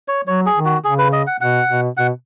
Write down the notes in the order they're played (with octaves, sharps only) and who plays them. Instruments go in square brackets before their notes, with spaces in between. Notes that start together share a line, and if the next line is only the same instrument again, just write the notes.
[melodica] C#5
[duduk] F#3 [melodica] C#5
[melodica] G#4
[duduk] D#3
[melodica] F#4
[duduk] C#3 [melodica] G#4
[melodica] B4
D#5
F#5
[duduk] B2 [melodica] F#5
[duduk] B2
[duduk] B2 [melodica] F#5